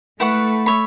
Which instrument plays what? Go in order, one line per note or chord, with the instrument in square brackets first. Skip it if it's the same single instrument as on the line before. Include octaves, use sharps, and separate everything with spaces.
[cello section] A3 [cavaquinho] E4 B4 F#5 C#6
[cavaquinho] C#5 E5 B5